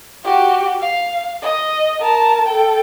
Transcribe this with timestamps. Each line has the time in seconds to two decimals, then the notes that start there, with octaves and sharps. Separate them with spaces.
0.25 F#4 G4
0.80 F5
1.43 D#5
2.01 A#4 A5
2.48 A4 G5